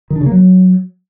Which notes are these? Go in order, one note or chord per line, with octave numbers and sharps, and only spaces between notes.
D#3
D4
C#3
A#3
F#3